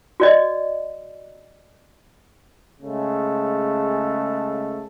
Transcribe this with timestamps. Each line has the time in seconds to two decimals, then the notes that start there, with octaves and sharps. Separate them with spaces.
0.20 F#4 D5 D#5
2.81 C#3 G#3 A3